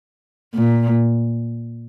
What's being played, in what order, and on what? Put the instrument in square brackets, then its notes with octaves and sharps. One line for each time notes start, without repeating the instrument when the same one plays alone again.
[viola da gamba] A#2